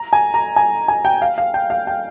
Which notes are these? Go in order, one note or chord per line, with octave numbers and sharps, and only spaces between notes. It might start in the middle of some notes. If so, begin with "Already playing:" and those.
Already playing: A#5
G#5
A#5
G#5
G#5
G5
F5
F5
G5
F5
G5